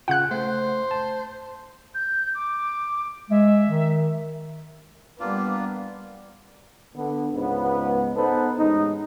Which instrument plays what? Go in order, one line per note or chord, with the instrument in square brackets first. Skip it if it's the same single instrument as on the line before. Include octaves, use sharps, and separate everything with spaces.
[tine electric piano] C#3 F4 [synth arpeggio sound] F#5 F#6
[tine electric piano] A3 [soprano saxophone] C5
[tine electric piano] A5
[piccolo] G6
D6
[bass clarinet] G#3 [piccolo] E5
[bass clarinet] D#3
[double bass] G3 B3 [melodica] A#3 D4 F4
[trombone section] D3 B3
C#2 G#2 B3
B3 D#4 A4 B4 C5
A1 G#3 D#4